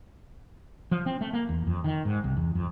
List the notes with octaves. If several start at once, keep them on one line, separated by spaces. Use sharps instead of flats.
F3
C4
A3
A#3
E2
F2
D#3
G#2
C2
E2
F2